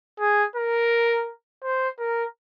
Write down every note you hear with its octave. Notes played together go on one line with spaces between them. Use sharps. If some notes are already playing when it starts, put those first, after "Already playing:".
G#4
A#4
C5
A#4